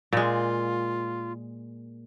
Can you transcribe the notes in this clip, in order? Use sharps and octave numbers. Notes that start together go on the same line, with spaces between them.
A#2 G#3 F4